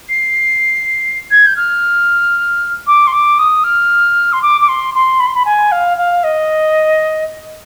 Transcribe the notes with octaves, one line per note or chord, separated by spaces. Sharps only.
C7
G#6
G6
F6
D6
C6
D6
D#6
F6
C6
D6
D6
C6
C6
B5
C6
B5
G#5
F5
F5
D#5